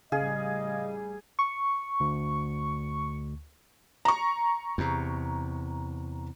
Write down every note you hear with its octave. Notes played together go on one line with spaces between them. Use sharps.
A1 C#3 G3 G#4 D#5 F5
C#6
D2
A#5 C#6
E2 C3